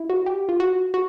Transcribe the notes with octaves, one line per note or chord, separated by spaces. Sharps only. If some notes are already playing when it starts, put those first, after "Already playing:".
Already playing: E4
F#4
G4
F4
F#4
F#4